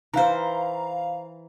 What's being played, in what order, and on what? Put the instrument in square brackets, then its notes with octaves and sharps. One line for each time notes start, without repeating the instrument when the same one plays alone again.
[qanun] E3 C5 [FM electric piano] F5 A#5